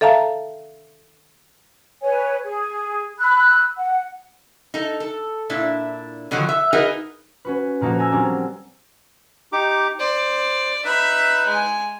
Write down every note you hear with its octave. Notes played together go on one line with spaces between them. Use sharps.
A4 E5 F5 A5 A#5
B4 C#5 G#5
G#4
B5 E6 F#6
F#5
D#4 A4
A4
A#2 D4 E4
B2 D3 D#3 F3 F#3
E5
D#4 F#4 G#4 A#4 B4 D#5
C#4 F#4 B4
A#2 F3 A#3 D#4 F#4 A4
G#5 A#5 E6
F#3 G3 C4 D4
D#4 G4 D6
C5 D5
D#4 B4 E5 B5
G#3 G#5